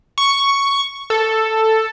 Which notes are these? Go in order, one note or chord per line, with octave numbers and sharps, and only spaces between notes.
C#6
A4